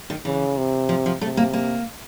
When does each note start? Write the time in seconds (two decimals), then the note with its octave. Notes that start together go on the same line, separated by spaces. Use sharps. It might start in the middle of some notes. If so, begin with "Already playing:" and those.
0.10 D#3
0.25 C#3 E3
0.57 C3
0.89 F3
1.06 F3
1.21 C3 A3
1.37 A#3
1.53 A#3